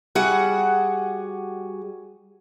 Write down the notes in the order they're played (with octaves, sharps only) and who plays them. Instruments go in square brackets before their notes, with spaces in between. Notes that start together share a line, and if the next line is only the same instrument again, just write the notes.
[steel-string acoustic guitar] G3 F#4 G#4 F#5